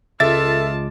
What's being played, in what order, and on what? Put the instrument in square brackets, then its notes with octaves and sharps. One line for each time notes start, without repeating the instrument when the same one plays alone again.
[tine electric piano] C#2 G#3 D6 [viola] F4 A5 [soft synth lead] A4 [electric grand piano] E5 A6